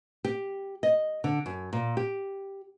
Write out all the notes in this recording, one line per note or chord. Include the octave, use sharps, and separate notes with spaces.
G4
D#5
D3
F#2
A#2
G4